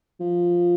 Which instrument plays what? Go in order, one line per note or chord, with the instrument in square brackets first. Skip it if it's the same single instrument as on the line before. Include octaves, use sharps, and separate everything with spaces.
[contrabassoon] F3